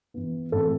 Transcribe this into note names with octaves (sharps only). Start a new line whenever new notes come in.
E3 B3
A2 E3 A3 C4 A4